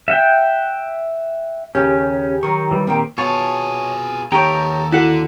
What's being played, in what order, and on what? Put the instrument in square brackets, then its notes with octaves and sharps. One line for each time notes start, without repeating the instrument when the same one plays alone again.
[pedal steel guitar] E5 F#5 G5
[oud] D#2 C#3 [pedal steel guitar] C#4 [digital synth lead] G4
[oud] D#3 F#3 [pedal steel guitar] C#6
[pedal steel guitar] E3 G3
[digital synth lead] A#2 [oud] D#3 G4 [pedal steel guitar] C4
[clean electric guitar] B2 [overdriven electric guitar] F4 G#4 [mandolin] C#5 A5
[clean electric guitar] D#2 D#4 G5 [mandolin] G4 C#5 [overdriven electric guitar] A4 A#5
[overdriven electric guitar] D3 [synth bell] E4 F#4 A4 [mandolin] F#5 F#6